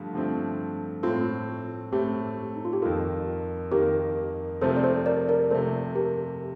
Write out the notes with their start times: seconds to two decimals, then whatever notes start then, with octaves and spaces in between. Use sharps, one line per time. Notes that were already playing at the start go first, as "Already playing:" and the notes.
Already playing: G2 D3 F3 A3
0.13 G2 D3 F3 A3 C4
1.03 A2 A3 C4 F4 A4
1.92 A2 A3 C4 G4
2.56 D#4
2.65 F4
2.73 G4
2.82 F2 D#3 A#3 F4 A4
3.72 F2 D#3 A#3 G4 A#4
4.61 C3 F3 A3 C4 A4 C5
4.76 D5
4.84 A4 C5
5.06 A#4 D5
5.29 A#4 D5
5.51 C3 F3 A3 C4 A4 C5
5.95 G4 A#4